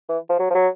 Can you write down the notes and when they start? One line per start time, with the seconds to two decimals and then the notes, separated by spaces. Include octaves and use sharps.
0.09 E3
0.30 F3
0.40 F#3
0.51 F3
0.55 F#3